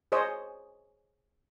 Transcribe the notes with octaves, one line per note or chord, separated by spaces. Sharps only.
G#4 C5 C#5 D#5